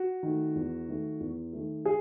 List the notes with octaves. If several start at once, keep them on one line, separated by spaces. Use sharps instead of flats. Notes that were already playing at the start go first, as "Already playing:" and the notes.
Already playing: F#4
D#3 A3
E2
D#3 A3
E2
D#3 A3
G#4